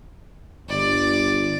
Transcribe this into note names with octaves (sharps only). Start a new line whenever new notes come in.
G1 D5